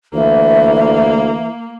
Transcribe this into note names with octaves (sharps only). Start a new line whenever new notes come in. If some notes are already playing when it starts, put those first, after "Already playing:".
D2 E3 A#3